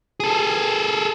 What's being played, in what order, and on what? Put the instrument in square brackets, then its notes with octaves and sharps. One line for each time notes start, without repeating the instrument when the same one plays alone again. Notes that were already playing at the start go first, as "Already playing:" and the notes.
[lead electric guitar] G#4 A4